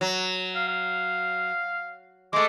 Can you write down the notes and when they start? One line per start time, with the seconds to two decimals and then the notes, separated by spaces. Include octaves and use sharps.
0.01 F#3
0.55 F5
0.69 F5
2.33 G#3 A3 D6